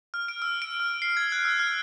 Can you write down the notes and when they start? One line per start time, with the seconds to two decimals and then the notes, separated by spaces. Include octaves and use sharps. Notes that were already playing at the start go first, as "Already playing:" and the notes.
0.14 F6
0.28 D7
0.42 E6
0.62 D7
0.80 F6
1.02 C7
1.17 G#6
1.32 F#6
1.45 E6
1.59 F6